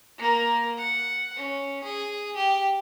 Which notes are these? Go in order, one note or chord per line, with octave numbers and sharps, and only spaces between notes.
A#3 A#4
F#5
C#4
G#4
G4